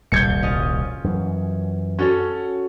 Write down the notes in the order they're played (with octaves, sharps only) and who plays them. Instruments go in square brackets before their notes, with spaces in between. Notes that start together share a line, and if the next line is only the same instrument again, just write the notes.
[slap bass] D#1 C2 F2 [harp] G3 [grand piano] G6 G#6 C#7
[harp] C#4 F4 D#5
[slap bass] F#2 E3
[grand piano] C#4 [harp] F#4 A4 C#5